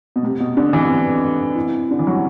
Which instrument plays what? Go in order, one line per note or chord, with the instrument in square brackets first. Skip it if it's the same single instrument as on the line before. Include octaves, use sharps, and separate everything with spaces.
[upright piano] B2
[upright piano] C3 [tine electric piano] A3
[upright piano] B2
[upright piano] D3 [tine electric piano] C4
[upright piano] E3
[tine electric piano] C4
C4
E4
[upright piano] D3 [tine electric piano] E4
[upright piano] E3
F#3